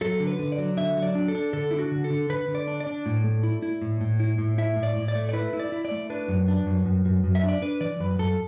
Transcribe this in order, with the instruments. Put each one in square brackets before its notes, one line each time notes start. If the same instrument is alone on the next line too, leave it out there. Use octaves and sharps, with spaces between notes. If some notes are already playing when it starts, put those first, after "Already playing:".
[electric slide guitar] F#3 A4
D3
B4
D3
D5
F#3
D3 E5
F#3
D5
D4
A4
D4
D3 A4
D4 E4
F#4
D3
A4
D3
D3 B4
D3
D5
D4
D5
D4
A2
A3
E4
E4
A2
A2
E4
A2
E4 E5
A2
D5
A2
D5
A3
D5
E4 B4
E4
D5
E4
D5
A3
D4 B4
F#2
D4
F#2
F#2
F#2
F#2
E5
D4
D5
D4 B4
E3 D5
F#2 B4
F#2 A4